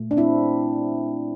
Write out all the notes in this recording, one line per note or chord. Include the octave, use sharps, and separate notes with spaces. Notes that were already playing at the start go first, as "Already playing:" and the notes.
Already playing: A#2 A3
D4
C4 E4